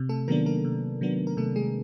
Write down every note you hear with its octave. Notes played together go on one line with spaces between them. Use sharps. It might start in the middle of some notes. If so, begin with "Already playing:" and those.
Already playing: C3
A3 A4
D#3 F#3 A#3 B3 D4 A#4
A#3 A#4
C3
D#3 F#3 B3 D4
A#4
C3 A3 A4
G#3 G#4